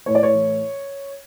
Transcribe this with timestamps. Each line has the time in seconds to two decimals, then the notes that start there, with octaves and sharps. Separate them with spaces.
0.06 A2 C#5
0.15 D5
0.23 C#5
0.34 E3